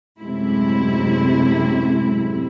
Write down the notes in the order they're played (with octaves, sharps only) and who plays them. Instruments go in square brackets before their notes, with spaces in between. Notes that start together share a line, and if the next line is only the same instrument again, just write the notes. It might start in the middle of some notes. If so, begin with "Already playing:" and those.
[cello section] F#2 A2 C3 G#3 E4